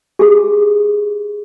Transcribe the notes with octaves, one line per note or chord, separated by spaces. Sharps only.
G4 G#4